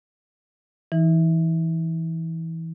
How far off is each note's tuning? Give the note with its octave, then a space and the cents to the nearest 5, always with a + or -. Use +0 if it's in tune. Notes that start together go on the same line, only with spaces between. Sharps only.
E3 -10 D#4 +45